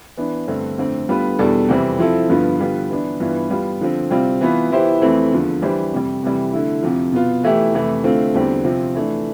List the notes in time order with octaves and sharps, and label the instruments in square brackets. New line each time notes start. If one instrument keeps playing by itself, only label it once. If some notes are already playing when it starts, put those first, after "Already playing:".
[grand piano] E3 B3 D4
G2 D3 A3 C4
F2 D3 A3 C4
D3 G3 B3 F4 B4
E2 B2 G3 D4 A4
F2 C3 E3 G3 C4
F3 C4 E4 A4
G2 D3 F3 B3 F4
D3 G3 B3 F4 B4
E3 B3 D4
G2 E3 B3 F4
G3 B3 F4
D3 F3 C4
C3 G3 C4 F4
E3 B3 F4
E3 B3 E4 G4 C5
F2 E3 A3 C4
E2 D3 F3
E3 G3 D4 G4 C5
F2 C3 G3
F2 C3 E3 G3
D3 A3 E4
F2 C3 F3
B2 B3 F4
E3 A3 E4 G4
F2 C3 E3 A3
D3 A3 C4 F4
E2 D3 G3 C4 G4
C3 F3 C4 F4
E3 A3 D4